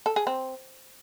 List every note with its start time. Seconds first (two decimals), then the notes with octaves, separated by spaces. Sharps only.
0.06 A4
0.16 G#4
0.27 C4